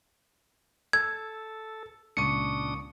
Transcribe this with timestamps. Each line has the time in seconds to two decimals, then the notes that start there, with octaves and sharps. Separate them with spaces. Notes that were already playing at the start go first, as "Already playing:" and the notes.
0.93 A4 E6 G#6
2.17 C#2 A#2 D4 C#6 D#6 C#7 D#7